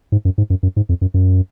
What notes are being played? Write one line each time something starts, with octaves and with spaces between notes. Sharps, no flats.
G#2
F#2
G#2
F#2
F#2
G#2
F2
F#2
F#2